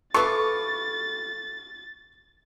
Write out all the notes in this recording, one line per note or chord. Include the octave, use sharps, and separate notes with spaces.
A3 B3 F4 A4 C#6 D6 A6